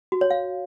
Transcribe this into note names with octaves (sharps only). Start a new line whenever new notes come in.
F#4
C#5
F5